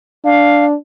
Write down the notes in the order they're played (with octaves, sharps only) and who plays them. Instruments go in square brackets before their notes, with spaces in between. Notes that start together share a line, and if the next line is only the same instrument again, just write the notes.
[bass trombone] D4 [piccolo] F5